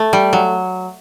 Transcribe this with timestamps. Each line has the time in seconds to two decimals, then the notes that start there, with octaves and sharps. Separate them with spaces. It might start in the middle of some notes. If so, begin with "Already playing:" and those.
Already playing: A3
0.13 G3
0.33 F#3